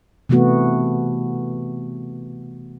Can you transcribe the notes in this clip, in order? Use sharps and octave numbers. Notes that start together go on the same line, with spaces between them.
C3 E3 A3 B3 F#4